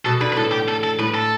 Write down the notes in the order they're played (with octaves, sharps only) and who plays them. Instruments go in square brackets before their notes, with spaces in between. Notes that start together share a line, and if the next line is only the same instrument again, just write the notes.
[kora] B2 [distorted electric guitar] A4
[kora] D3 [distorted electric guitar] B4
[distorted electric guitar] B4
[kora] A2 [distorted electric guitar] A4
[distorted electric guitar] G4
A4
A4
[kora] A2 [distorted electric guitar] B4
[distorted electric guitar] A4